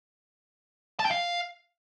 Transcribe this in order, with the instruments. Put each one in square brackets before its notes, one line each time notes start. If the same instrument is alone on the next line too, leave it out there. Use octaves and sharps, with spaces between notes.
[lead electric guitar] A5
G5
F5